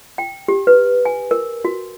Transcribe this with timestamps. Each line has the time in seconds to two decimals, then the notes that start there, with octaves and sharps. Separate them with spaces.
0.18 G5
0.48 G4
0.67 B4
1.05 G#5
1.31 A#4
1.65 F#4